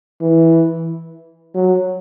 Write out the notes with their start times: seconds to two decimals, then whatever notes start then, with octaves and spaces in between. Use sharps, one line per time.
0.21 E3
1.54 F#3